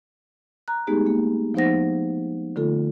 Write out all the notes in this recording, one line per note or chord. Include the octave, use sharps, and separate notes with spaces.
A#5 F#6
G#3 A3 B3 D#4 G4 G#4
A#3
F3 B3 D#4 C5 F#5 A#6
D3 A3 F4 A4